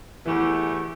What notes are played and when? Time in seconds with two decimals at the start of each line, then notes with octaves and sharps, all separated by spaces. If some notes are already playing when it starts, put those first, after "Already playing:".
0.26 E2 E3 A3 G4